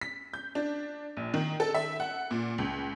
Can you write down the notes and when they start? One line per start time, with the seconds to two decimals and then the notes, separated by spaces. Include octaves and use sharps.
0.01 B6
0.34 G6
0.55 D4
1.17 A#1
1.34 D#3
1.60 A4
1.74 E5
2.00 F#5
2.31 A#2
2.58 C#2